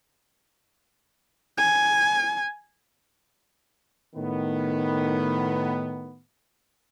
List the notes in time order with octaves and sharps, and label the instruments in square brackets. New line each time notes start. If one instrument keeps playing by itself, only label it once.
[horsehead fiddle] G#5
[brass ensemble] A2 D#3 B3